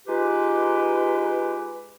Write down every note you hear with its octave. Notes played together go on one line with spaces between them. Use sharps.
G#3 D#4 F4 G4 B4